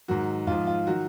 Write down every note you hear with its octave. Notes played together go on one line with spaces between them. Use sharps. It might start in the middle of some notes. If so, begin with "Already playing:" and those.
G#2 D#3 F#3 F#4
G#2 F3 F4
F4
D#3 F#3 F#4